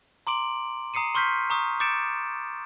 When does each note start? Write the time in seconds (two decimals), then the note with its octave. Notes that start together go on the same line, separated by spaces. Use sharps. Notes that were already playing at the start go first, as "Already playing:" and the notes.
0.27 A#5 C6 D6 D7 F#7
0.94 A#5 D#6 C7 C#7 D#7
1.15 C6 C#6 F6 G6 B6 C7
1.50 A#5 C#6 D#6
1.80 D6 G6 A6 C#7 D7 E7